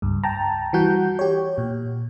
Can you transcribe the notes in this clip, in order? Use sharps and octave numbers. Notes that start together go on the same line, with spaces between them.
C#2 G2
G5 A5 A#5
E3 G3 F#4 F#5 G6
G4 C#5
A#2